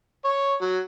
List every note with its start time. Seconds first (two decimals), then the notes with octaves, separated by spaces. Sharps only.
0.24 C#5
0.61 F#3